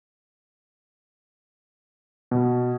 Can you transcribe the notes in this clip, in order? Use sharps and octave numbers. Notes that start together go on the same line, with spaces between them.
B2